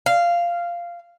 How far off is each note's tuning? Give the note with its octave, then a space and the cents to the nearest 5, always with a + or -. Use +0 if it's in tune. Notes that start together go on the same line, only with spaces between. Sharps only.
F5 -10